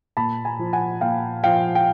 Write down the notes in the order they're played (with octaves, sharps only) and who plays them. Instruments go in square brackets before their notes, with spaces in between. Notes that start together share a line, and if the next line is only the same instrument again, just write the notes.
[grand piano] A#2 A5 B5
G#5 A#5
F3
F#5 G#5
A#2 F5 G5
F3 F5 G5
G5